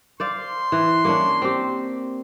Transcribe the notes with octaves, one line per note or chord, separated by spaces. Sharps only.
C5 D5 F5 C6
E3
A#3 C#4 D4
C4 G4